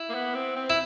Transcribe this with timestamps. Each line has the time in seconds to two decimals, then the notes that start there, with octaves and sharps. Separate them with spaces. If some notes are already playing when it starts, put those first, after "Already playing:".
Already playing: E4
0.09 A#3
0.14 B3
0.35 C4
0.56 C4
0.70 E4